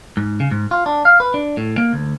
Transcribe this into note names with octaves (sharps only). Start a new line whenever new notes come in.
G#2
C#3
G#2
F4
D4
F5
B4
D4
A2
A#3
D2